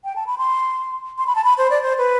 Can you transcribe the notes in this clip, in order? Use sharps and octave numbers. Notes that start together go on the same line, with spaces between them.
G5
A5
B5
C6
C6
B5
A5
B5
C5
D5
C5
B4